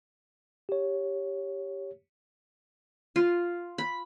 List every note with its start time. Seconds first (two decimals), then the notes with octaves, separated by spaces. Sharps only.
0.69 G4 C#5
3.16 F4
3.78 B5